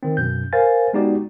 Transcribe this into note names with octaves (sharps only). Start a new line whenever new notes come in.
D#3 C4
F#2 B2 G6
A#4 C5 F5 G#5 A6
G#3 B3 D#4 F#4 G4 D5